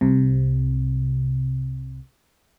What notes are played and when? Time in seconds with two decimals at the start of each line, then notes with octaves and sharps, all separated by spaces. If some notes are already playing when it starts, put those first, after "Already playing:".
0.01 C2 C3